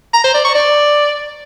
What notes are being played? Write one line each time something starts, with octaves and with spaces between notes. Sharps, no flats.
A#5
C5
D5
C#6
D5